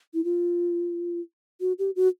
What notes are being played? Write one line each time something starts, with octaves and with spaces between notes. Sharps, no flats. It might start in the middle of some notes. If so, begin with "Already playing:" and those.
E4
F4
F#4
G4
F#4